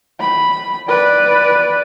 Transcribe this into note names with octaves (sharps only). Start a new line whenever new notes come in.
B5
B4 D5